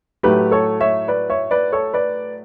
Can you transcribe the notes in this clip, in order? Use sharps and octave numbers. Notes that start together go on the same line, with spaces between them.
A2 F#3 A3 G4 B4
A4 C#5
C#5 E5
B4 D5
C#5 E5
B4 D5
A4 C#5
B4 D5